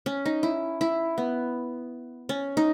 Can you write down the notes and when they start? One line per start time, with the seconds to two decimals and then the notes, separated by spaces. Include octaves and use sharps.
0.06 C#4
0.26 D#4
0.43 E4
0.81 E4
1.18 B3
2.29 C#4
2.57 D#4